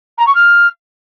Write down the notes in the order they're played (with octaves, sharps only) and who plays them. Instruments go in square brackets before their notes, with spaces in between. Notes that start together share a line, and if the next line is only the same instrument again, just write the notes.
[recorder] A#5
C#6
F6